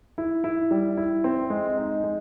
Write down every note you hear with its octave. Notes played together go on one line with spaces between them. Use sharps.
E4
E4
G3
E4
C4
G#3
D#4
G#3